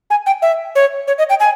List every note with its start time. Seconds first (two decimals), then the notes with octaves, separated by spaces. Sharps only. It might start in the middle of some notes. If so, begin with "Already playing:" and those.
0.10 G#5
0.26 G5
0.42 E5
0.75 C#5
1.08 C#5
1.18 D#5
1.30 G5
1.40 G#5